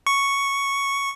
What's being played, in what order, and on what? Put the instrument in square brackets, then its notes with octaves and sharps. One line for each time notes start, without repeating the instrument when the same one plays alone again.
[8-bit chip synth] C#6